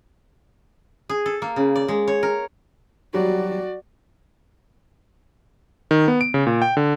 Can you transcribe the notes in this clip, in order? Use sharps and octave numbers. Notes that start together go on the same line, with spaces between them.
G#4
A4
A#3
C#3
D5
G#3
C#5
A#4
F#3 G3 F#4 D5
D#3
B3
D7
C#3
A#2
G5
D3